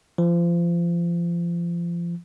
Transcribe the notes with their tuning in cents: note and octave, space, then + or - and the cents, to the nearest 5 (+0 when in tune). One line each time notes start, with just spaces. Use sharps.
F3 -30